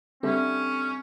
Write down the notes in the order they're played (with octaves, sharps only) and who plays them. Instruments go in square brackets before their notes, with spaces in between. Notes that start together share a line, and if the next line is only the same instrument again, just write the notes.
[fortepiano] D3 G3 E5 [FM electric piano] C4 [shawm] C#4